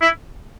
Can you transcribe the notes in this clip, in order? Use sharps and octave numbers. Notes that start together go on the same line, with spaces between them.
E4